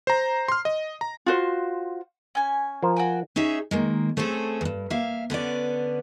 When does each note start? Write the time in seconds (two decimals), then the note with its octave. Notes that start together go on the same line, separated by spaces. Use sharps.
0.07 C5 A#5
0.48 C6 F6
0.65 D#5
1.01 A#5
1.26 F4 F#4 C5
2.35 C#4 G#5
2.82 F3 A#4 C5
2.96 F#4 G5 G#5
3.36 C#4 D#4 G#4 E5
3.71 D#3 G#3 A#3
4.17 A3 C4 C#4 G#4 A4
4.61 E2 G2
4.90 A#3 E5 F5
5.30 D3 B3 C#4 D5